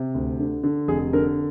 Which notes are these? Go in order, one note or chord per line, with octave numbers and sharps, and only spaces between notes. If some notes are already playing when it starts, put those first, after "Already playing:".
Already playing: C3
D2
D3
D3
F1 G#4
D3 A#4